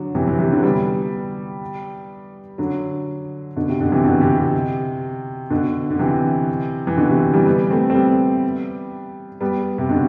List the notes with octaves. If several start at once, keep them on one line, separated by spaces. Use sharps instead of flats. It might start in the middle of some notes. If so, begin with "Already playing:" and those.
Already playing: D3 F#3
C3 E3
C3 E3
C3 E3
D3 F#3
G3 B3
D3 F#3
B2 D3
C3
B2 D3
C3 E3
B2 D3
C3
C3
B2 D3
D3
C3 E3
E3
B2 D3
C3
E3 G3
G3 B3
A3 C4
C4
G3 B3
G3 B3
C3
B2 D3